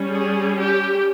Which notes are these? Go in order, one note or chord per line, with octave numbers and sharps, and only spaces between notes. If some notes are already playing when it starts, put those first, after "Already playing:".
Already playing: G3 C#4
G#4
G4